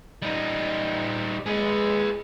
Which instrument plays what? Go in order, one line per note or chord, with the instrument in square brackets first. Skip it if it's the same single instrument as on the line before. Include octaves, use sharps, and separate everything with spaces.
[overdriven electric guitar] G3 D#4
[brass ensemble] G#3 [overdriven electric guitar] G#4 B4